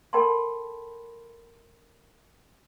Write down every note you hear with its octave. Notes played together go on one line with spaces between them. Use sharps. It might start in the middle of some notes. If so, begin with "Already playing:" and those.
A4 A#4 G5 A5 B5 C6